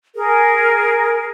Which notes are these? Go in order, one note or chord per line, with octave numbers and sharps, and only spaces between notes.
G#4 A#4